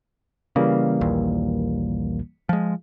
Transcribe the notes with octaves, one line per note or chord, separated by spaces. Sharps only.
C#3 E3 G3 A#3
A#1 D#2
F3 G#3